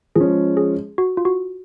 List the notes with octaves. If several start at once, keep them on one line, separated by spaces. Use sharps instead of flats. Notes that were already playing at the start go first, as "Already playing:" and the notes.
F3 G#3 C#4 G#4
G#4
F#4
F4
F#4